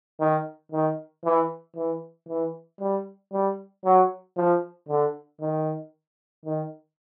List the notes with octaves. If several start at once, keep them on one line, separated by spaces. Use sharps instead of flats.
D#3
D#3
E3
E3
E3
G3
G3
F#3
F3
D3
D#3
D#3